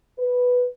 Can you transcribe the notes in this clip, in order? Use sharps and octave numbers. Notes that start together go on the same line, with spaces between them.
B4